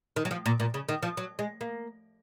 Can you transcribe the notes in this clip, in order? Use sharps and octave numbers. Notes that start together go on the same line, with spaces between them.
D#3
F#3
F3
A#2
A#2
C#3
D#3
F3
F#3
G#3
A#3